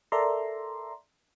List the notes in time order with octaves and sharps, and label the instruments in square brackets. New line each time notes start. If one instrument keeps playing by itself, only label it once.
[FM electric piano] A4 A#4 D5 E5 A#5 C6